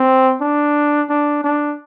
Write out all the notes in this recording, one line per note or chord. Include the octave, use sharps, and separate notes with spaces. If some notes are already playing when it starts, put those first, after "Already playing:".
Already playing: C4
D4
D4
D4